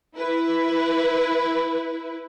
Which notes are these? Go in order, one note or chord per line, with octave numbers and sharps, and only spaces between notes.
E4 B4